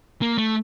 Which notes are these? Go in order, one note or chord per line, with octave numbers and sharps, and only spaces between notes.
A#3
A3